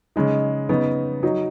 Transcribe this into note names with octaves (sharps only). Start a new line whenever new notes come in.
C#3 G#3 D#4
C#3 B3 D#4
F#3 D#4